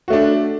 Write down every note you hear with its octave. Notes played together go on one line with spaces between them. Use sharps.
A3 D4 F#4